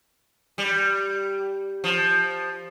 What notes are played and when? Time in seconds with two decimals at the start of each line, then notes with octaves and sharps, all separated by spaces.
0.58 G3
1.84 F3